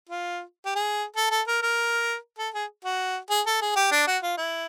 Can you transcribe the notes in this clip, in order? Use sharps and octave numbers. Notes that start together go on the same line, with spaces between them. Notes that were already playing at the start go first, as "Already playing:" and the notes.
F4
G4
G#4
A4
A4
A#4
A#4
A4
G#4
F#4
G#4
A4
G#4
G4
D4
F#4
F4
E4